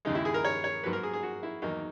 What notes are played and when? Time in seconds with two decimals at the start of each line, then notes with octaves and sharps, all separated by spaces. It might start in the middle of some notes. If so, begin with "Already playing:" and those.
0.05 D#2 C#3 G#3 D#4
0.15 E4
0.25 G#4
0.34 A#4
0.44 C#5
0.64 C#5
0.83 G#2 F#3 A#3 B4
0.93 A#4
1.03 G#4
1.14 G#4
1.23 F#4
1.43 E4
1.62 E2 D#3 F#3 A#3 D#4